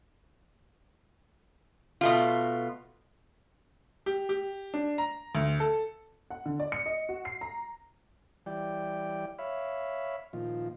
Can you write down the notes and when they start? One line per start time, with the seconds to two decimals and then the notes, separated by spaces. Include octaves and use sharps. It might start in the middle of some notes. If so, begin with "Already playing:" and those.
2.01 B2 A3 F4
4.06 G4
4.29 G4
4.74 D4
4.98 A#5
5.35 D2
5.60 A4
6.30 F#5
6.46 D3
6.60 D5
6.72 C#7
6.86 D#5
7.09 F#4
7.25 C7
7.41 A#5
8.46 E3 G3 D5 G5
9.39 C#5 E5 F5 B5
10.33 A#2 D#3 F3 F4